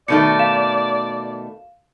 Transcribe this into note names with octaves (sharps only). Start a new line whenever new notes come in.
B2 D#3 A3 D5 C#7
F5 E7